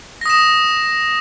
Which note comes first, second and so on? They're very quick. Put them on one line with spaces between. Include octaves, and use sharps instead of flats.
A#6 D#6 E7